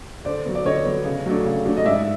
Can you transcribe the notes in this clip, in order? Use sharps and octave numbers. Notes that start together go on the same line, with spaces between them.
D3 C5 D5
F#3 B3
D5
D3 C#5 D#5
F#3 B3
C#3
F#3 A3 D4
C#3
F#3 A3 D4
D#5
G#2 D5 E5